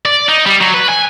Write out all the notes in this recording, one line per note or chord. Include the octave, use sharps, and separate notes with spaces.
D5
D#4
G3
F#3
B4
G#5